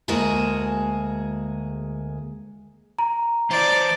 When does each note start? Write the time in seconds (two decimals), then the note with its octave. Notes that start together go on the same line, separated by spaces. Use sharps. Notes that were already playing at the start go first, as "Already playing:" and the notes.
0.08 D2 G#3 A#3 F#4 G#4 A5
2.99 A#5
3.50 E3 C5 D5